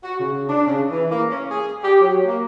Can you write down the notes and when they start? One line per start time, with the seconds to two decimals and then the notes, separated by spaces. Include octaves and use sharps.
0.04 F#4
0.20 C#3
0.49 D4
0.67 C#3
0.91 E3
1.12 A#3
1.30 C#4
1.51 G#4
1.84 G4
2.01 F#3
2.26 A#3